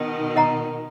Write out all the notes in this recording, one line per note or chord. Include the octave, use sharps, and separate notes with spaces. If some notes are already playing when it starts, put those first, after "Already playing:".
Already playing: B2 D#3
A#4 D#5 F#5 A#5